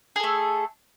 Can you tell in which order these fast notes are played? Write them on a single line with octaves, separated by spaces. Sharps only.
G#4 A4 A3